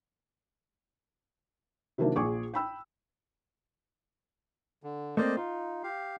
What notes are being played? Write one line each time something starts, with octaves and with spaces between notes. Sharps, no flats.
C3 D#3 F#3 A#3 D4 E4
A#1 F4 G#4 C#6 D6
G5 B5 E6
D3
A3 A#3 C4 C5 D5 D#5
D#4 F4
G4 F5